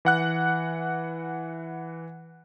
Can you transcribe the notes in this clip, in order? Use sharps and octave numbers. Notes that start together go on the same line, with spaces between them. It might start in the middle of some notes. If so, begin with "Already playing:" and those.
E3 F#5 F#6